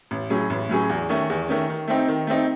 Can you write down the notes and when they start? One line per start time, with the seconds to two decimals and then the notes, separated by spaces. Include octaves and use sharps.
0.11 A1
0.30 A2 F#3 C#4 G#4
0.50 A1
0.69 A2 F#3 C#4 G#4
0.90 E2
1.09 D#3 A3 C#4
1.30 E2
1.48 D#3 A3 C#4
1.69 D#3
1.88 A3 C4 D#4
2.08 D#3
2.27 A3 C4 D#4